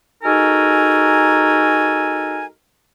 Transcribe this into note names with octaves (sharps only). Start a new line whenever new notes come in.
G#3 D#4 F#4 A4 A#4 G#5